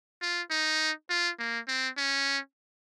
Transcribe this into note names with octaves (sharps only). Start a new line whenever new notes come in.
F4
D#4
F4
A#3
C4
C#4